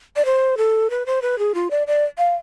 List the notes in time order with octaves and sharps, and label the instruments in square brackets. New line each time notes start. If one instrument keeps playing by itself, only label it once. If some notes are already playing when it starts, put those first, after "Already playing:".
[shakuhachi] D5
C5
A4
B4
C5
B4
G#4
F4
D5
D5
F5